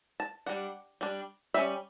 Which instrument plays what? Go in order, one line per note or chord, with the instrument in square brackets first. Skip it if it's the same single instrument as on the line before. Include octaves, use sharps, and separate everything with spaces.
[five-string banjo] A5
G3 D4 F#5
G3 D4
G3 C#4 E5